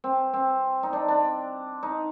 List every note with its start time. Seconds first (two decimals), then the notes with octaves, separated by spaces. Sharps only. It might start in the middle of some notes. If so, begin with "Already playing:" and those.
0.04 C4
0.34 C4
0.83 D#4
0.93 D4
1.08 D4
1.83 D#4